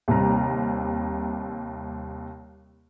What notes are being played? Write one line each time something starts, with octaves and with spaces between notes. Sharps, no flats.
D#2 C3 G3 A#5